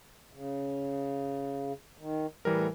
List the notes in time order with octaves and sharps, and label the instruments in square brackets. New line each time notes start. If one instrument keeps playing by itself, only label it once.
[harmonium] C#3
D#3
[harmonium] A2 [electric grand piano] E3 G3 A#4